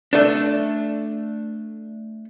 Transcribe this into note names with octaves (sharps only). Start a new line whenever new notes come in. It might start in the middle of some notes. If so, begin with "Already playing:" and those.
A3 D4